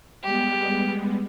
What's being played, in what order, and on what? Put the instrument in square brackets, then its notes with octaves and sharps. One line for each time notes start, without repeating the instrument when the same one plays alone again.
[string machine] G3 G#3 B3 [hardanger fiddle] G4